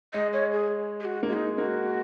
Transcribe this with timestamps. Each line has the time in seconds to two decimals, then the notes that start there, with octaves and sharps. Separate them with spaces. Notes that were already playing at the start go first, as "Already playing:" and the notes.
0.14 G#3 D#5
0.33 C#5
0.52 G#4
1.00 G#4
1.05 F#4
1.23 A#3
1.29 G#3 F#4
1.33 D#4
1.58 A#3 F#4